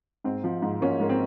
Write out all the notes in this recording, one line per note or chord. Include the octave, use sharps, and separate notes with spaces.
G#2 C4
F3
G#2
F3 A#3 C#4
G#2 A#3
C4